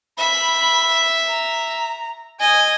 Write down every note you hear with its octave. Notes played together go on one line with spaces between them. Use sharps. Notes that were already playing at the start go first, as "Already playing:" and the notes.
E5 B5
A#5
D#5 G#5